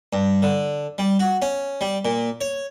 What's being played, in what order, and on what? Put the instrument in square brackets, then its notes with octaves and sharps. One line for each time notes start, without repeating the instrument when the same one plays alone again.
[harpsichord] G2
D3
G3
F#4
C#4
G3
A#2
C#5